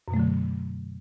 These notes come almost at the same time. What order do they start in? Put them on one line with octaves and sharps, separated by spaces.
F#2 B2 A3 F#3 D3